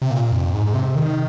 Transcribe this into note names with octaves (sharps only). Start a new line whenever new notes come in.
C3
A#2
F2
G#2
C3
D#3